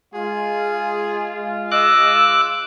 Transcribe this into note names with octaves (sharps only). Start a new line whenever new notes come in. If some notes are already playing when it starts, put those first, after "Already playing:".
G#3 F4 G#4
D#5 D6 E6 F#6